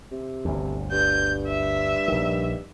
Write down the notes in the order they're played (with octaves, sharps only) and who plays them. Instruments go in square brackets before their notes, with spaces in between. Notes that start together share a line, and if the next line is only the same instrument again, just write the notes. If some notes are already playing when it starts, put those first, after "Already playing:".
[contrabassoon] C3
[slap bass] G1 D2
[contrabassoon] G2 [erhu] G6
[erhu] E5
[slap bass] A#1 D#3